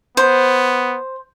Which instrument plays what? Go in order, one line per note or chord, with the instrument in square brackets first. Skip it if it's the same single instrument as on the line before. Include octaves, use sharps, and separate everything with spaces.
[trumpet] B3 [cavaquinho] C5